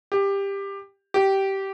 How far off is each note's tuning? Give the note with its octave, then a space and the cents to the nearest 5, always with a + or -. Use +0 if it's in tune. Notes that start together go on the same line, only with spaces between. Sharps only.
G4 +15
G4 -15